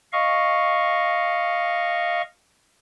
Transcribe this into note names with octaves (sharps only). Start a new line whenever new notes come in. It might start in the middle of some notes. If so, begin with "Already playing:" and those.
D#5 F5 C#6